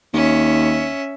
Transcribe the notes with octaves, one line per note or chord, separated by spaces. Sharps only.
D#2 C#4 E5